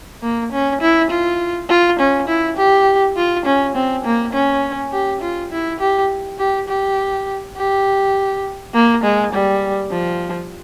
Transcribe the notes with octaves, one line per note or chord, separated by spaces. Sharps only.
A#3
C#4
E4
F4
F4
C#4
E4
G4
F4
C#4
C4
A#3
C#4
G4
F4
E4
G4
G4
G4
G4
A#3
G#3
G3
F3